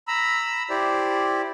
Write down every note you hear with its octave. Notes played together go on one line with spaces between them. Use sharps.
A#5 B5 E6
E4 G4 C5 D5